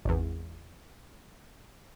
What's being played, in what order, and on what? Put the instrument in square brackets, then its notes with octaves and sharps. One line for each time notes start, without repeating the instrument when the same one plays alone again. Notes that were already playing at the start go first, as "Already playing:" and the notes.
[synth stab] G#1 E2